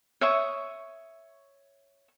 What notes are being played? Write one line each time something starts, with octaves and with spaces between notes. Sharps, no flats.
C#5 E5 C#6 D#6